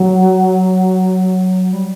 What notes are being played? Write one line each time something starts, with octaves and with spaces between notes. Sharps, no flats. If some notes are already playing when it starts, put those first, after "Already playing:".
Already playing: F#3
G3